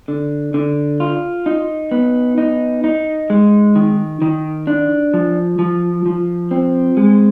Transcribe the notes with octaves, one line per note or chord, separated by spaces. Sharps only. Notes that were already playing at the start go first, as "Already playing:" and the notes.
D3
D3
F4
D#4
B3
D#4
D#4
G#3
D#3
D#3
D4
F3
F3
F3
C4
G#3